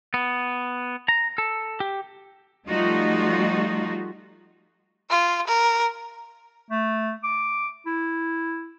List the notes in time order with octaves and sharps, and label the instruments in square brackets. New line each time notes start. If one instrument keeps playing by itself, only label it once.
[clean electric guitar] B3
A#5
A4
G4
[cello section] F3 G3 A3 D#4 F4 F#4
[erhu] F4
A#4
[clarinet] A3
D6
E4